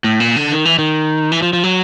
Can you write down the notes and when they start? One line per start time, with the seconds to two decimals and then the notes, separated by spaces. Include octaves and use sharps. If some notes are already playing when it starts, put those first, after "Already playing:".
0.04 A2
0.20 A#2
0.36 D3
0.52 D#3
0.65 E3
0.79 D#3
1.32 E3
1.42 F3
1.53 F3
1.64 F#3